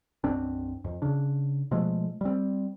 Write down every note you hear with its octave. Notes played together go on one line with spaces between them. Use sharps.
B1 F#2 C4 D4
F2
C#3 D4
B2 F3 G#3 A3
G3 C4